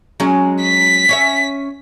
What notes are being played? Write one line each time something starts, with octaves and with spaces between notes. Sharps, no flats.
F#3 G#3 C#4
B6
C#4 C#5 E5